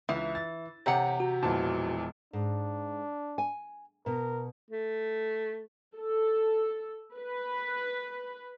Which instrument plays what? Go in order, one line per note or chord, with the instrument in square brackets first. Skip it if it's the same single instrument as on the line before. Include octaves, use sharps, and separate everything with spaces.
[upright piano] C#2 [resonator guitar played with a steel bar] E3 [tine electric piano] E5
[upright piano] A6
[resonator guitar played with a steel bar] E2 F#5 [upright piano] C3 G4 A#5 [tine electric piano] C#5
[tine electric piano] F#4
[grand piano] E1 F3 A5 [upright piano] A#2 E3
[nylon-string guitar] G#2 [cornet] D4
[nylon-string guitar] G#5
[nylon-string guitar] B2 [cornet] A#4
[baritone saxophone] A3
[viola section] A4
B4